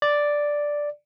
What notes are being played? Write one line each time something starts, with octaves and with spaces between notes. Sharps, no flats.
D5